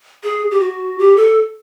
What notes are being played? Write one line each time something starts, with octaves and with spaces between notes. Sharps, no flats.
G#4
G4
F#4
G4
A4